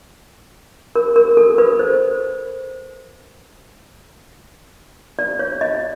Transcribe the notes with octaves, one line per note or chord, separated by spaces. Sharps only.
A#4
A#4
A4
B4
C5
D5
C#5
D#5